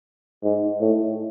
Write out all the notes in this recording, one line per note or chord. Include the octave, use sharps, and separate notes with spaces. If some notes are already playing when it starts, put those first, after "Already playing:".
G#2
A2